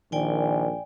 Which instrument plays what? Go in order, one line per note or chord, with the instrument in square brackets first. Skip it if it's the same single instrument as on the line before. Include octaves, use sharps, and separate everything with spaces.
[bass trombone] A#1 [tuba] D#3 [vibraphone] D5 G5 G#5